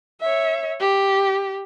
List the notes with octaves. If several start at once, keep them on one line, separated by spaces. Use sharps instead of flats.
C#5 E5
G4